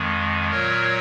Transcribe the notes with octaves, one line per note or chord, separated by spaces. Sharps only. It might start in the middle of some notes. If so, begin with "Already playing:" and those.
Already playing: F2 D#3 G#3
A#2 F#3 A#4 C#5